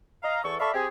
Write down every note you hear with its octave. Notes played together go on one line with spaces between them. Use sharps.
D#5 F5 A#5
E2 A4 C#6
A4 D5 E5 F5 B5 C#6
C4 G4 G#4